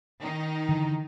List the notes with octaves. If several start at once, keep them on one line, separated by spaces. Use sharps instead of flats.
D#3 D#4
D3 E3